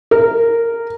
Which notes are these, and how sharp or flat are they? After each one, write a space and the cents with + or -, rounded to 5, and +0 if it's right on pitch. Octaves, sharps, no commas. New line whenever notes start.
A#4 -10